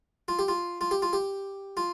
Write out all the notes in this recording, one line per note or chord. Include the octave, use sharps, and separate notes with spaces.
F4
G4
F4
F4
G4
F4
G4
F4